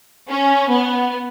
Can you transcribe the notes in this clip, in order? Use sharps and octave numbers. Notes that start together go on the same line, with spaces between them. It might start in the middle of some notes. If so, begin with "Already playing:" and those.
C#4
B3